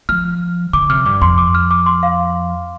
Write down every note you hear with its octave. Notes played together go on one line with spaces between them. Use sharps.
F3 F6
D3 D6
C3 F6
G2 D6
F2 C6
D6
F6
D6
C6
F5